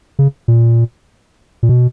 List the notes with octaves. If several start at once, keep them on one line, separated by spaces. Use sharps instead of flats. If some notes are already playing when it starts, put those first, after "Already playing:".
C#3
A#2
A#2
B2